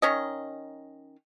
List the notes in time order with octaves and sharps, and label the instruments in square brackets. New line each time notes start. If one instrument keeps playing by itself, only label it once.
[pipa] D#3 C#4 D#5